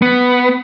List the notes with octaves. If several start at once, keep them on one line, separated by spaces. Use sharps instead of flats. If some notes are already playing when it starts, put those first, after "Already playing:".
B3